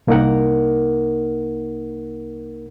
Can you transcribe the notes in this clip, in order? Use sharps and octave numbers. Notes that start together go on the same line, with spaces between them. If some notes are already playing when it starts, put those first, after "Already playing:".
C2 A#3 D#4 A#4 F#5